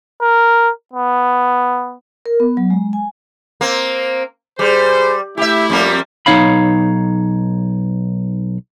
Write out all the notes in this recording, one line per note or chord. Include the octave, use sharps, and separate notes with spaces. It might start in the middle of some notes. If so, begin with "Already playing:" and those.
A#4
B3
A#4
B3
F#3
G#3
G#5
A#3 C4
G3 G#4 C5
A3 E4 G4 E5
F2 G3 A#3
B1 D#3 D#4 C#5 F5 B5